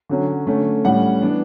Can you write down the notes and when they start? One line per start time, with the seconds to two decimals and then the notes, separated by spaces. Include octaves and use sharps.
0.09 D3 F#3 C#4
0.47 D3 A3 C#4
0.84 A2 G3 C#4 F#5
1.22 E3 B3 D4